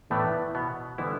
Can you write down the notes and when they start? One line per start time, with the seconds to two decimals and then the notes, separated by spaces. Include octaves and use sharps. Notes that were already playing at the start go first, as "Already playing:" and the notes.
0.10 A2 E3 A3 B3 E4 B4 D5
0.55 B2 B3
0.98 D3 E3 G3 B3 E4